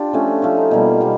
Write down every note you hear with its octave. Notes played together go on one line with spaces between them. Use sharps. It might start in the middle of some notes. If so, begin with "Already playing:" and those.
Already playing: D4 F4 G4
F3 A3 C#4
F3 A3 C#4
D#4
B2 G3 A#3
B2 G3